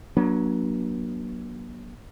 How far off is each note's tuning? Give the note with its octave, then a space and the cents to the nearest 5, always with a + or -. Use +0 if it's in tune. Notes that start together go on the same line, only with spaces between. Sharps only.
F#3 +0 A#3 +45 D4 +0